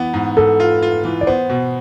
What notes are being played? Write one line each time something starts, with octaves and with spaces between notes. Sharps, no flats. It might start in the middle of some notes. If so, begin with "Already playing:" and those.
Already playing: E3 B3
G#2
G#2 A4
F4
F4
E3
D5
B3 C5
B2